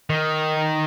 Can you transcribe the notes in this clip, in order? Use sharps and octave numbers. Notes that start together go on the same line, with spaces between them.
D#3